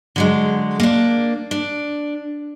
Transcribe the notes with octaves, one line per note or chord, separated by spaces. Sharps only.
D3 F#3 G#3
A#3 D4
D4